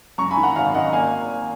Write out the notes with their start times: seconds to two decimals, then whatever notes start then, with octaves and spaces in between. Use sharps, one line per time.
0.18 F#2 A#5 C#6
0.31 G#5 B5
0.37 D#3
0.43 F#5 A#5
0.55 G#1 F5 G#5
0.74 G#1 D#5 F#5
0.93 A#3 F5 G#5